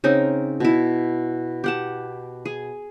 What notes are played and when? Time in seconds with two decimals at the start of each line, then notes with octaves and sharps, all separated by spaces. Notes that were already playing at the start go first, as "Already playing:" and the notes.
0.04 C#3 C4 D#4 A#4
0.60 B2 E4
1.64 G4 F#5 A5
2.45 G#4